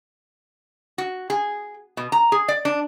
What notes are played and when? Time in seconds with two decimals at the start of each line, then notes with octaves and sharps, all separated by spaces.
0.98 F#4
1.30 G#4
1.97 B2
2.12 A#5
2.32 G#4
2.48 D5
2.65 D4